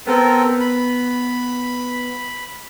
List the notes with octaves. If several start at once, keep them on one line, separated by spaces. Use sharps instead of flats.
B3 C4 A4 A#4
B5